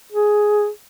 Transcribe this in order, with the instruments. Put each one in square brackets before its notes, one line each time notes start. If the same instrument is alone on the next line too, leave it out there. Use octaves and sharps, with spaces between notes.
[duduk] G#4